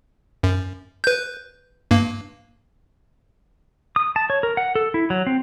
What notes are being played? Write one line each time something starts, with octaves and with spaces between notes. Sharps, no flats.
F#2
B4 G6
G2 A#3
D#6
A5
C#5
A#4
F#5
A4
E4
F#3
C4